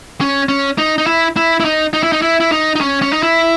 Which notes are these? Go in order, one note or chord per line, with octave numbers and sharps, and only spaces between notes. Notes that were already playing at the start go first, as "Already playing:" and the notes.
C#4
C#4
D#4
D#4
E4
E4
E4
D#4
D#4
E4
D#4
E4
E4
D#4
D#4
C#4
C#4
D#4
E4